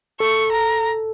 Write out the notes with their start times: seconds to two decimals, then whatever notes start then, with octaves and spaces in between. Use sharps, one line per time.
0.20 A4 C#6
0.52 A#5